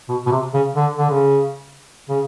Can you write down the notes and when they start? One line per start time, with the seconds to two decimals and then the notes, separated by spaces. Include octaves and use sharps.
0.09 B2
0.27 B2
0.32 C3
0.54 C#3
0.76 D3
0.98 D3
1.10 C#3
2.09 C#3